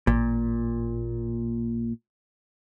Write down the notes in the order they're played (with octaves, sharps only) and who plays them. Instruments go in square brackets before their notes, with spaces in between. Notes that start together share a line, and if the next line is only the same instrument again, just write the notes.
[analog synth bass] A1 [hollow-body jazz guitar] A#2